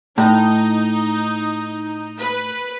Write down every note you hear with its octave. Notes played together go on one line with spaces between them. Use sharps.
A2 D#4
B4